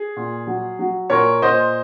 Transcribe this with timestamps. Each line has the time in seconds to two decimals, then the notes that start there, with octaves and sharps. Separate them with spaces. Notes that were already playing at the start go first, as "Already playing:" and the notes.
Already playing: G#4
0.16 A#2
0.47 F#3
0.79 F#3
1.10 A#2 A#4 C#5
1.42 A#2 C5 D#5